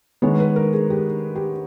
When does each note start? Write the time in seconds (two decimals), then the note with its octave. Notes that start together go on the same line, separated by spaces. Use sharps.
0.22 D#3 G#3 B3 C#5
0.40 B4
0.56 A#4
0.73 G#4
0.90 G4
1.36 G4